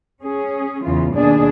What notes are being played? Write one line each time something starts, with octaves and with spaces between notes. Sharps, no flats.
C#4 G#4
E2 C#3 E3 F4
D#2 B2 D4 G#4 D5